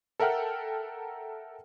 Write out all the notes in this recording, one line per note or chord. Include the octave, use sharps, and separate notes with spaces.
A4 A#4 E5 F#5 G5 F6